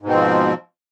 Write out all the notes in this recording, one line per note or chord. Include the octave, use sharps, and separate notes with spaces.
G#2 B2 F3 C4